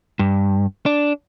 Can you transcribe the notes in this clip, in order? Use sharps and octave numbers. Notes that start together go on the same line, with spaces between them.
G2
D4